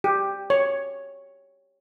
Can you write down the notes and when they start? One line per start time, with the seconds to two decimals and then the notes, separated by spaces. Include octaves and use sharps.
0.04 G4
0.50 C#5